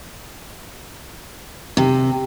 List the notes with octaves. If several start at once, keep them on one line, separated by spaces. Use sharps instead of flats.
C3